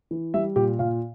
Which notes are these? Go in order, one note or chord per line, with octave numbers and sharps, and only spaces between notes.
E3
G3 E5
A#2 G4
A#2 F5